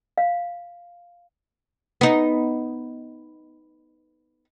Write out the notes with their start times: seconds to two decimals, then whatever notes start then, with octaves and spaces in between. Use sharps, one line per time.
0.18 F5
2.01 B3 D#4